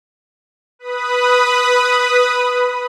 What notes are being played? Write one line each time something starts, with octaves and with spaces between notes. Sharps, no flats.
B4 B5 D#6